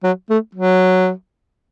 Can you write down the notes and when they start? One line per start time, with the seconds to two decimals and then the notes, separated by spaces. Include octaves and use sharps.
0.04 F#3
0.30 A3
0.55 F#3